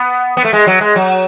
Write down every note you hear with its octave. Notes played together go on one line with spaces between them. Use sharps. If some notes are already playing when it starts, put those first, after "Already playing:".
Already playing: B3
B3
A3
G#3
F#3
G#3
F#3